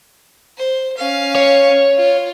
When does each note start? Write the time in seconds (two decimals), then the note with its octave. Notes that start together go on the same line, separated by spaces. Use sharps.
0.57 C5
0.97 C#4 F5
1.35 C#5
1.98 F4